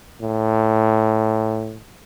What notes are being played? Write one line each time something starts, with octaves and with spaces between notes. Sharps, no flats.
A2